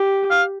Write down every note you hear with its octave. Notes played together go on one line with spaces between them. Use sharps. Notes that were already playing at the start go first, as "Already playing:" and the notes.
Already playing: G4
F5